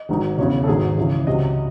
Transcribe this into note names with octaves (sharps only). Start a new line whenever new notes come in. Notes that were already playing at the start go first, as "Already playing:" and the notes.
Already playing: D#5
G#1 G#2 D#3 F#3
E1 E2 C#3 E3 C#5
A4
G#1 G#2 D#3 F#3 G#4
C#2 C#3 E3
C#2 C3 F#3 D#5